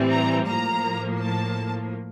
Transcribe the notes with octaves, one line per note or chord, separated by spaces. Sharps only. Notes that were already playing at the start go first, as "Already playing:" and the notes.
Already playing: A2 E3 G3 C4
A#5
A2 F3 A#3 A#5
A5